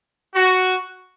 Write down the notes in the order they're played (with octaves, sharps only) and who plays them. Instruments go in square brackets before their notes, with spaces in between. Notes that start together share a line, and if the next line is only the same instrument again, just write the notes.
[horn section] F#4